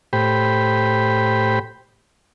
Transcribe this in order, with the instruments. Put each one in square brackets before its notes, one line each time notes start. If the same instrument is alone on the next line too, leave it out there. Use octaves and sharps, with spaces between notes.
[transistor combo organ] A2 G4 C5 G5 B5